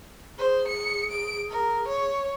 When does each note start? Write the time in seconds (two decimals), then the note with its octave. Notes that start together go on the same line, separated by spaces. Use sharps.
0.39 G#4 C5
0.68 C#7
1.11 D7
1.50 A#4
1.88 C#5